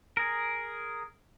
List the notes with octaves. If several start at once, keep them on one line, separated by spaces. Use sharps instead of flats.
G#4 A#4